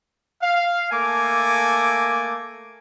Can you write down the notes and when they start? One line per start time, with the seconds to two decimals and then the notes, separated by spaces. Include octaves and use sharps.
0.42 F5
0.92 A3 A#3 A4 G#5 D6